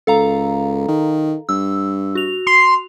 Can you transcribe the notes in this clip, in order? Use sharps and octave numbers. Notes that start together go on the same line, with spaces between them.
C#2 A4 F5 A#5
D#3
G2 E6
F#4 F7
C6